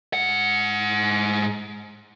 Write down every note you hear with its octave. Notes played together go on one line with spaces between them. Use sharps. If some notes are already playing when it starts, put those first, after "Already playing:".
G#2 F#5